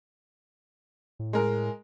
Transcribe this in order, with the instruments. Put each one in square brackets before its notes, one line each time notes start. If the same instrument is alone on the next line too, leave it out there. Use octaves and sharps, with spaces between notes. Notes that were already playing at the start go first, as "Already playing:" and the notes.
[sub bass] A2
[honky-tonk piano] G#3 A#4